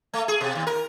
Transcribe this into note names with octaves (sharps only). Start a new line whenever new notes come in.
A3
G#4
B2
D#2
A#4